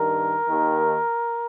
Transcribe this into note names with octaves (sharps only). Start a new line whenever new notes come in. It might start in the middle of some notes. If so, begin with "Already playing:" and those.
Already playing: G2 D#3 A#4
D#2 D#3